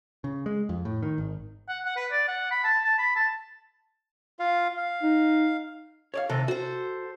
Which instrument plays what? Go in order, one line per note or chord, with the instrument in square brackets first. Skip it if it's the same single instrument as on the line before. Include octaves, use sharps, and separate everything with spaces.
[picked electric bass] C#3
G#3
F2
A2
D#3
G#1
[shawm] F#5
F#5
B4
D5
F#5
B5
A5
A5
B5
A5
[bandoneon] F4 F5
F5
[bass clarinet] D#4
[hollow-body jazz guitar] C#5 D5 F5
[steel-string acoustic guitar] C3 D#3 E3 [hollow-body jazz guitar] A4
[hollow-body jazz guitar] F#4 [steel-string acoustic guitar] A4 C5